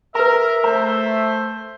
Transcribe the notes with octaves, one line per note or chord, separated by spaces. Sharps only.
A#4 B4 E5 A#5
A3 C5 A#5